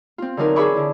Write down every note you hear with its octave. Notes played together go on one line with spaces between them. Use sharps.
C4 F4
D3 E3 F#3 D#4 A#4
G#4 C#5 E5 B5 C#6 D6
D3 E4